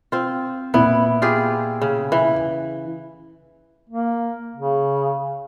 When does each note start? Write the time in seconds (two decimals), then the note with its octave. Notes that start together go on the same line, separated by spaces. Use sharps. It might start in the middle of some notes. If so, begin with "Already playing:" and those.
0.12 C4 F4
0.74 A#2 B3 E4
1.22 F4 G4 G#4
1.81 C#3
2.12 E3
3.90 A#3
4.56 C#3